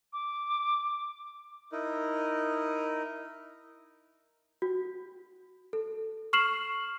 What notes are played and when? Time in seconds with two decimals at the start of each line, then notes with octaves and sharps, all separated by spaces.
0.13 D6
1.72 D#4 E4 A#4 D#5
4.62 F#4
5.73 A4
6.33 C#6 F6 C7 E7 F#7